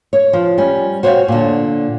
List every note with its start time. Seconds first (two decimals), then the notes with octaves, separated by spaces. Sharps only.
0.13 C#5
0.33 F3
0.58 G3 C#4
1.03 F#4 C5 C#5 D#5 F5 G5
1.28 A#2 D3